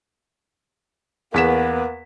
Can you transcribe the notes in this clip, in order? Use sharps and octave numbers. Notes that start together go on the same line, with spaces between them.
E2 A#3 B3 B6 E7